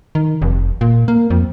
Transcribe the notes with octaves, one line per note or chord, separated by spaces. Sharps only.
D#3
F1
A#2
A#3
F2